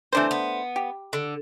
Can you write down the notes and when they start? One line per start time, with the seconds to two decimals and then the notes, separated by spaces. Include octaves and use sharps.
0.12 E3 A3 C4 D4 C5
0.31 B3
0.76 G4
1.13 D3